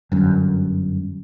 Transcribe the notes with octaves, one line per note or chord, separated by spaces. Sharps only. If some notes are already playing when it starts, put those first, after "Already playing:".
G1 F#2